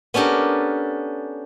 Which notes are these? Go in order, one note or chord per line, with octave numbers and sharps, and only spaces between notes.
B3 C#4 D4 G4 A4 A#4